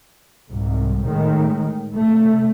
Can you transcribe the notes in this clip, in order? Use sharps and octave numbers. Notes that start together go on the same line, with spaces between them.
C2 G#2
A2 D#3 G#3
C3 A3